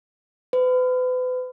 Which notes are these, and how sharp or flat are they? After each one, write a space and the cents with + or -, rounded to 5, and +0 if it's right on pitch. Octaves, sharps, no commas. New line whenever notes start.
B4 +40